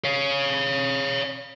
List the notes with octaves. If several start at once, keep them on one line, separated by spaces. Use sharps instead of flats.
C#5 F5